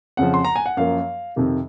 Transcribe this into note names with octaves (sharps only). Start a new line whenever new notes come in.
F2 C#3 F3 F#5
C6
A#5
G#5
F#5
F#2 F3 A#3 F5
F2 C3 D#3